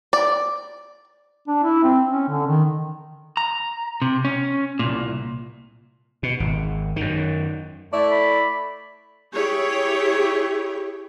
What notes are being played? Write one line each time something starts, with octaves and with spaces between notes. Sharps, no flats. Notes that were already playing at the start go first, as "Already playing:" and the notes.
D5
D4
E4
C4
C#4
D3
D#3
A#5
C3
C#4
C2 A#2
B2
G#1
F#2 D#3
A3 E4 D5
B5
E4 G4 G#4 C#5